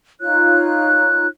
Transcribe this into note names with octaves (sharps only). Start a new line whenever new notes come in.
D#4 F4 C#5 F#6